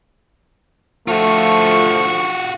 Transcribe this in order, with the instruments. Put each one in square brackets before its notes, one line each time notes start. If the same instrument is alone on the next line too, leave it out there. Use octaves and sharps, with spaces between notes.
[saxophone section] D3 F3 [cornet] A3 [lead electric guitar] F4 F#4 [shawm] C#6